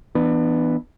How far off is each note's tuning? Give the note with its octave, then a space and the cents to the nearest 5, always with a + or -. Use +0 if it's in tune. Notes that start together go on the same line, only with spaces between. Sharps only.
E3 +0 B3 +0 D4 +35